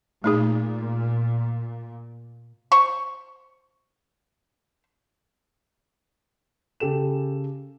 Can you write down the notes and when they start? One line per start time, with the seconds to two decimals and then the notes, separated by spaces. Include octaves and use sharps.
0.24 A#2 A3 D#4 G#4
2.72 C5 C#6
6.80 C#3 G4 A4 E7